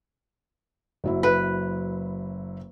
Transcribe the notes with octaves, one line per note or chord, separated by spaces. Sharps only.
F#1 F#3 E4
B4